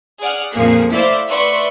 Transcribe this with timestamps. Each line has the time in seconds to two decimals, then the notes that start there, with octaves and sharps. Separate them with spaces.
0.21 G#4 D5 F#5 F6
0.53 F2 A#2 F3 A#3 G#4 C7
0.92 A3 E4 C5 D5 E5 F5
1.27 B4 D5 E5 F#5 C6 C#6